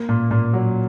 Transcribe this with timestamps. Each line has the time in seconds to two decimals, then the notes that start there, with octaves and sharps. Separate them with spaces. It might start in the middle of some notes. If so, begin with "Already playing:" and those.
Already playing: A#3
0.09 A#2
0.31 A#2
0.53 F#3